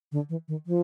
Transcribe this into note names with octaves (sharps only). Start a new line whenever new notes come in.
D3
E3
D#3
F3